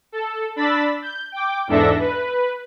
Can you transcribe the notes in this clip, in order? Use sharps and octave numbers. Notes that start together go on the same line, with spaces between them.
A4
D4 B5 E6 A6 B6
G6
G5 D6
E2 G#2 D4 A4 E5 A#6
B4